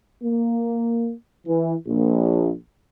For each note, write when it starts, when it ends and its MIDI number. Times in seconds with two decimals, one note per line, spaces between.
0.23 1.12 58
1.47 1.74 52
1.86 2.53 34